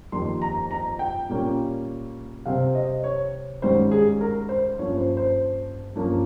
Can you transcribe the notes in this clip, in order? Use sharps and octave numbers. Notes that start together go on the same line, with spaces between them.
F2 D#3 G3 A#3 C6
A#5
A#5
G5
A#2 G3 A#3 C#4
C3 G3 C4 F5
D#5
C#5
G#2 D#3 G3 C#4 C5
G#4
A#4
C5
G2 F3 A#3 C#4 C#5
C5
C5
G2 F3 A#3 C#4